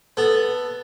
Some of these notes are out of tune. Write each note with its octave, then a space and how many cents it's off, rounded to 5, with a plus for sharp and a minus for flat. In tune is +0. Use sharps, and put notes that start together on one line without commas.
B3 +0 A4 +0